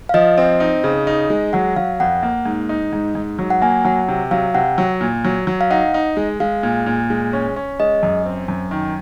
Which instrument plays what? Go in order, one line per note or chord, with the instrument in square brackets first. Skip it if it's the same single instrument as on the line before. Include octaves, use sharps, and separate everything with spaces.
[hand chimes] F5
[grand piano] F3 [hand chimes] D#5
[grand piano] C4
D#4
C#3
D#4
G#3
[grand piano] F#3 [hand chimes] F#5
[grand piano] F#3 [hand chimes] F5
[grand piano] F2 [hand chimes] F#5
[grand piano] A#3
G#2
D#4
G#2
G#2
F#3
[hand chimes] F#5
[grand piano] A#3 [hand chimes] G#5
[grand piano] F#3 [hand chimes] F#5
[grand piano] C3
[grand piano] F#3 [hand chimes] F5
[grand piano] C3 [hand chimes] F#5
[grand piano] F#3
A#2
F#3
F#3
[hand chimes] F5
[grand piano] D#4 [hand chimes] F#5
[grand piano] D#4
G#3
[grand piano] G#3 [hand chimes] F5
[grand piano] A#2
A#2
G#3
C#4
C#4
[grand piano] G#3 [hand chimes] D#5
[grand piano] F#2
C4
F#2
D#3